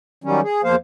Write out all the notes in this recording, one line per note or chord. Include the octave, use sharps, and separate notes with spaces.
D#3 F#3 G3 C#4
G#4
E2 F3 A#3 C5 F5